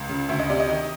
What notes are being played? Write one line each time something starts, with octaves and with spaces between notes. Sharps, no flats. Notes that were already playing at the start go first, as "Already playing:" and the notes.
Already playing: C#2
C#3
D2 E5
D#5
C3 D5
D#5
D#3